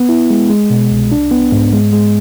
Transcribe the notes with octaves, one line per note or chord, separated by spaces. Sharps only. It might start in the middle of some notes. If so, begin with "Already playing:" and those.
Already playing: B3
E4
G#3
G#3
B2
C2
D4
B3
G#2
G#3
G#3